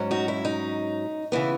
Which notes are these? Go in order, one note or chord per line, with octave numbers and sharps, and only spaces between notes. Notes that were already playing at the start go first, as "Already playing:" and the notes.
Already playing: G#2 F#3 C#4
D#4 F#4
E4
D#4
C#3 E3 B3 E4